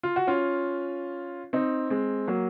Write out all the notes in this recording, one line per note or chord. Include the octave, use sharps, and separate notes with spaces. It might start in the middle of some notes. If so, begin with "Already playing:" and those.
F4
F#4
C#4 F4
C4 D#4
G#3 C4
F#3 A#3